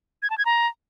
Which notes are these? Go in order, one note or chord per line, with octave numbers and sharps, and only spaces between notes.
G#6
A5
G#6
A#5